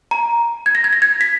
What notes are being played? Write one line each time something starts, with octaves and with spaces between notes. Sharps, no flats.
A#5
G#6
A#6
G#6
A#6
G#6
B6